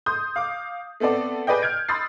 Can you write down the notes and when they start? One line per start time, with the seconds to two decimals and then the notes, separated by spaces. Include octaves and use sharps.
0.06 C6 D#6 G6
0.36 F5 D6
1.00 A3 B3 C4 A4 D5
1.47 G#4 B4 D5 D#5 G5
1.62 F6 G6 G#6 D7
1.88 B5 C6 D#6 E6 A6 C7